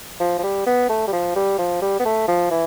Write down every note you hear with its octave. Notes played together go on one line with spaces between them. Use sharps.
F3
F3
G3
B3
A3
G3
F3
G3
F3
G3
B3
A3
F3
E3